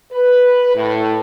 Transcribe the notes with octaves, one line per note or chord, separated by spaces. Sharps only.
B4
A2